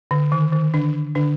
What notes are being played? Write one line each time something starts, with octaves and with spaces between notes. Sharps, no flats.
D3
D#3
D#3
D3 D4
D3 D4